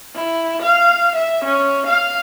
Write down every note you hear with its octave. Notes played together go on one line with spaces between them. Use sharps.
E4
F5
E5
C#4
F5